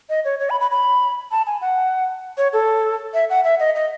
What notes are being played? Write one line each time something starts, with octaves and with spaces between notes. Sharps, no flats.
D#5
C#5
C#5
B5
B5
B5
A5
G#5
F#5
C#5
A4
E5
F#5
E5
D#5
D#5